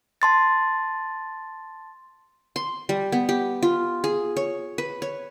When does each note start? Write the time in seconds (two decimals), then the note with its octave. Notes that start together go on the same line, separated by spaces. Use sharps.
0.22 A5 C6 A6
2.56 C6
2.89 G3
3.12 B3
3.29 G4
3.63 F4
4.04 G#4
4.37 C#5
4.78 B4
5.02 C#5